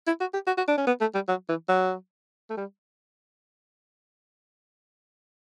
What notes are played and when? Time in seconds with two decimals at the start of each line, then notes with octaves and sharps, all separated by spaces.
0.07 E4
0.20 F#4
0.33 G4
0.47 F#4
0.57 F#4
0.68 D4
0.77 C#4
0.87 B3
1.01 A3
1.14 G3
1.28 F#3
1.49 E3
1.69 F#3
2.50 A3
2.57 G3